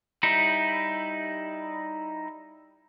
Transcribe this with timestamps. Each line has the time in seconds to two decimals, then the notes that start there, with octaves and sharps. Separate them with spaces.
0.23 G3 D#4 E4